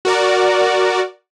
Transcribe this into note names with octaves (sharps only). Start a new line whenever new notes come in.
F#4 A#4 D5